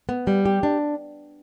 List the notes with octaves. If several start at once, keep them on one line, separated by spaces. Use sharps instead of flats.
B3
G3
G4
D4